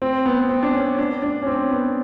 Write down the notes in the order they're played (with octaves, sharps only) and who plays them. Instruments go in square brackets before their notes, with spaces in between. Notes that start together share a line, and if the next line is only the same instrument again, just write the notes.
[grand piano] C4
B3
C4
D4
C#4
D4
D4
C#4
C4
B3